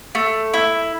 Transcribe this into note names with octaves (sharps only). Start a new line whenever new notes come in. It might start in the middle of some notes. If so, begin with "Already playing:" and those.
A3
E4